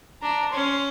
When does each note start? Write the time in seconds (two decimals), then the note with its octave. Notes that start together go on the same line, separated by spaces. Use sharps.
0.22 D4 A#5
0.52 C#4 C6